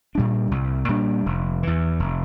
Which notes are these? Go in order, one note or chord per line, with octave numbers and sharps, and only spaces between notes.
A#2 G3 D4
C2
A#2 G3 D4
F1
E2 E3
F1